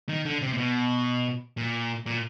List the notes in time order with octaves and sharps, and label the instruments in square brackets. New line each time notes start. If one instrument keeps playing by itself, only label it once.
[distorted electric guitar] D#3
D3
C3
A#2
B2
A#2
A#2